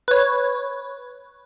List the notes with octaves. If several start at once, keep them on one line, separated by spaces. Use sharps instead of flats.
B4 C#5